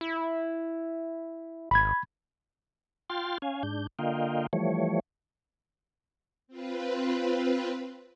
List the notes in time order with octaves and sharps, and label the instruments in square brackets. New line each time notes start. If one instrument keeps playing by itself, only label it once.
[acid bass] E4
[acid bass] G#1 [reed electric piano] B5 G#6
[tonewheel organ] F4 G5 C6 F6 A6
C#4 F5 G#5
G#2 D4 G6
D3 A#3 F4 D#5 F5 G5
E3 F3 G3 A3 C#5
[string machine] C4 F4 B4